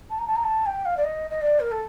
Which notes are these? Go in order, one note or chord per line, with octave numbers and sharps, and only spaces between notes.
A5
A#5
A5
A#5
A5
G5
F5
D5
D#5
D#5
D5
A#4
A4